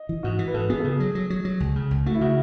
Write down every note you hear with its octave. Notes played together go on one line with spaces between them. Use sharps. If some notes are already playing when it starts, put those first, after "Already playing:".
Already playing: D#5
E3
G#2 F#4
E3
B4
G#2 A4
B3 G#4
C#3 A4
G#4
F#3
F#3
F#3
F#3
C#2
C#3
C#2
A3 F#4
E4
C#3 F#4